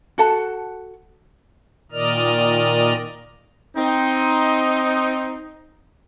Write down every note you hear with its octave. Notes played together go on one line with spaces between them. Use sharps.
F#4 A4 F#5 A5
A#2 D#3 A#4 D5 D#5 F6
C4 D#4